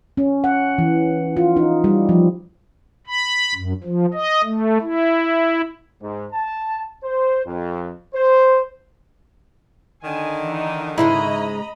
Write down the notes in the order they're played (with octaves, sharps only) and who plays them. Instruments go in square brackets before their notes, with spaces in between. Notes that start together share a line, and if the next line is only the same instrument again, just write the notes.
[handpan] C#4
F#5
E3
F4
D#4
G3
F3
[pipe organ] B5
F#2
F3
D#5
A3
E4
[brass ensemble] G#2
A5
C5
F2
C5
[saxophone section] D3 D#3 [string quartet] G#5
[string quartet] E3 D#4
[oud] G#2 C#3 G#3 [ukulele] E4 [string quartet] D#5 A#5 B5